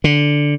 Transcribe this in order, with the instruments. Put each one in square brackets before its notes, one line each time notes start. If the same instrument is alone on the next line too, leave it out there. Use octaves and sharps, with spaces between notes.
[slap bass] D3